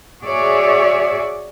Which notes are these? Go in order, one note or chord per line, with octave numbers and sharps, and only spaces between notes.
F#4 G#4 C#5 D5 E5